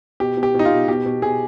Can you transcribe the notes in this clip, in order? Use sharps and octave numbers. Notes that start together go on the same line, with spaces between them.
B2 G4
B2
G4
B2 D#4
F4
B2
B2 G4
B2
B2 G#4